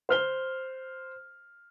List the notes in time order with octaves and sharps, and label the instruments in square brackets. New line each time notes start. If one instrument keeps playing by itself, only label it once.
[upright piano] C5 F6 G7